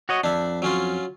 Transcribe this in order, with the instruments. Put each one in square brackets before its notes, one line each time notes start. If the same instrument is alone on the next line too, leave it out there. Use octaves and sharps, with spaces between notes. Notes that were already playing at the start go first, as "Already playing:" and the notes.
[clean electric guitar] F#4 C#5 D#5
[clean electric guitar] F2 [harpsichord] D4 E5
[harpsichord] F#3 C#4 F4